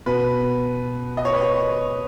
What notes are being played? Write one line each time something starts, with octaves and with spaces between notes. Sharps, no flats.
B2 B4
D#5
C#5
B4
C#5